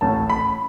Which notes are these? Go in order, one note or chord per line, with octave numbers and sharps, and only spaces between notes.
A1 A2 A3 C#4 A5
B5